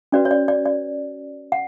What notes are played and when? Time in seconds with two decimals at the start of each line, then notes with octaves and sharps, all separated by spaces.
0.12 C#4 F#4 B4 D5
0.25 C#5
0.31 D5
0.48 D5
0.66 D5
1.52 F#5